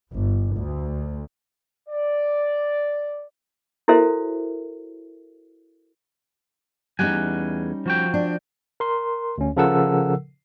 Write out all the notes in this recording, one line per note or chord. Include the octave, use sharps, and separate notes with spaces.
G1
D2
D5
E4 F#4 A4 A#4 C5 E5
E2 G3 C#4 D#4 F#5 G#5
F3 F#4 G5
D4
A#4 C6
D2 C#4
C#3 F3 A4 A#4 F#5 E6